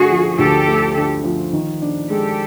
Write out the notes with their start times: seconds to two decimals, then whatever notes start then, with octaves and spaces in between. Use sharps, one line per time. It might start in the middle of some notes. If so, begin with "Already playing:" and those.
Already playing: D3 A3 F#4 G#4
0.10 F3
0.38 D2 G4 A4
0.67 A3
0.96 D3
1.24 F3
1.53 D#3
1.81 D4
2.10 G#3 G4 A4